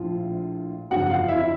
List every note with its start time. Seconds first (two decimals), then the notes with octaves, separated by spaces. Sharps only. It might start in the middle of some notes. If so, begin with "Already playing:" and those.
Already playing: A#1 A2 F3 F4
0.90 G1 F2 C#3 F#3 F#4 F#5
1.10 F4 F5
1.28 E4 E5
1.40 E5